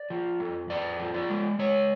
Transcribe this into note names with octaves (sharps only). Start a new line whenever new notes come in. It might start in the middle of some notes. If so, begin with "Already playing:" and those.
Already playing: D5
F3
F2
F2 D5
F3
D5
G#3
G#3 C#5